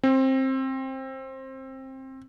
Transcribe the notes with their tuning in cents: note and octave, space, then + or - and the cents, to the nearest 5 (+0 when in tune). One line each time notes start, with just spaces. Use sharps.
C4 +20